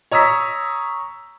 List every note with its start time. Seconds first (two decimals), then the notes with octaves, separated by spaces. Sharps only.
0.11 C#5 A#5 D#6 E6 B6